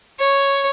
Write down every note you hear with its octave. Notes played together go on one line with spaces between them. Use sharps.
C#5